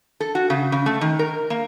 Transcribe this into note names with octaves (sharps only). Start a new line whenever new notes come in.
A4
F#4
C#3
C#3
A3
D#3
A#4
A#3